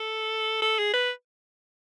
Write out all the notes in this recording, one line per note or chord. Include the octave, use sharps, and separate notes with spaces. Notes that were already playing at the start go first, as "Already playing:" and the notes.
Already playing: A4
A4
G#4
B4